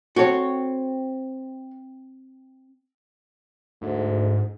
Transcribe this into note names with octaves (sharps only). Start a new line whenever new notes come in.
C4 F#4 A4 C#5
D2 G#2